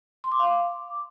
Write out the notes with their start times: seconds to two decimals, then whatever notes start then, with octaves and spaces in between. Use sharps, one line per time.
0.24 C6
0.32 D6
0.39 F5
0.47 D6